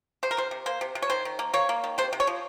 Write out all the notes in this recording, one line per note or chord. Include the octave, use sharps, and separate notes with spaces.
C3 C5
A#4
C3 C5
C3
A#3 C5
C3
C3
C#5
D#3 C5
D#3
A#3
A#3 C#5
A#3
D#3
C3 C5
C3
C#5
F3